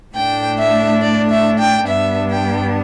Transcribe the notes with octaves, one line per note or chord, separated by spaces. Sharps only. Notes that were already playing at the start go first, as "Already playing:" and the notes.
A2 A3 D4 G5
E5
D5
E5
G5
G2 G3 B3 D4 E5
G5